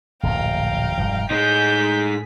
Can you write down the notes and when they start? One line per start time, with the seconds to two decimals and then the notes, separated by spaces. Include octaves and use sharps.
0.23 D1 A#1 F#2 F5 G5 A#5
0.98 E1 G2 F3
1.30 A2 G#3 D#4 G#4 G6 B6